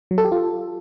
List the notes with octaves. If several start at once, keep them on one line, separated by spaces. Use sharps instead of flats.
F#3
A4
G4
F4